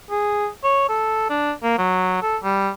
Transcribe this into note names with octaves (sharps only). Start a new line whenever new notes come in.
G#4
C#5
A4
D4
A#3
F#3
A4
G3